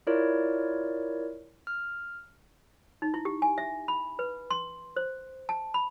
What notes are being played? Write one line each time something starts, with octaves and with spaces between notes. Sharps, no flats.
E4 F4 A#4 C#5 D5
F6
D#4
E4
G4
G#5
E5
B5
B4
C6
C5
A5
B5